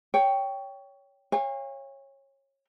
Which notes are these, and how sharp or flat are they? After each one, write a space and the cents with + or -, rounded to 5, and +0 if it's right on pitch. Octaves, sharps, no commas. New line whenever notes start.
C#5 +15 G5 +0
C#5 -20 F5 +0 G#5 -45